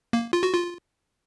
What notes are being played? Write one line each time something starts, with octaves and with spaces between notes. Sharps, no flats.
A#3
F4
F#4
F4